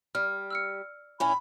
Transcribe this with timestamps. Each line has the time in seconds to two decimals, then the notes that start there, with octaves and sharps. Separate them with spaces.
0.15 G3 F6
0.51 E6 F6 C#7
1.20 A2 C#4 E4 G#5 B5